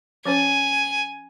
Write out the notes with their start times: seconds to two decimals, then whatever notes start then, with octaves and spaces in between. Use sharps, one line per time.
0.25 F3 C#4 C5 G#5